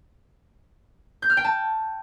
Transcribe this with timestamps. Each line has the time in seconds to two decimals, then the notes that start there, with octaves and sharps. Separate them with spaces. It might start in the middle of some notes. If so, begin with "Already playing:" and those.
1.22 G6
1.30 F6
1.37 G5
1.44 A5